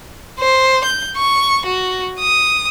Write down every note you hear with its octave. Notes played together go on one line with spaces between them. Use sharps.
C5
G6
C#6
F#4
D#6